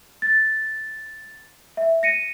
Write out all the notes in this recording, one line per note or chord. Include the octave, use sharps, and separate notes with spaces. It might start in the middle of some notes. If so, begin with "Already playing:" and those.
A6
E5
A#6 C#7 D#7